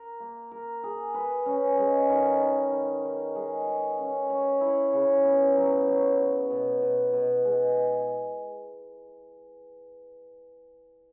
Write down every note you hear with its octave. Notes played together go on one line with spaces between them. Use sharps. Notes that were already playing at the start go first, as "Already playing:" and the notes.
Already playing: A#4
A#3
A#4
G#4
B4
C#4
G#3
D#3
D#3
D#3
D#3
G#3
F#4
C#4
C#5
E4
C#3
B3
F#3
F#3
F#3
B2
B2
B2
G#3